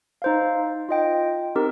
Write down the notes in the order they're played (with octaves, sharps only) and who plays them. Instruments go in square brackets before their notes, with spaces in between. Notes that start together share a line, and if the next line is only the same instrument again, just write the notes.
[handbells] D#4 C5 F5
F4 D#5 G5
C4 D#4 G4 A#4